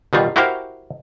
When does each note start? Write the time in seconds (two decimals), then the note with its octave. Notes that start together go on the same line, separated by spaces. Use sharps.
0.13 B2 D#3 G3 F4
0.36 E4 F#4 G4 A#4 C5 F5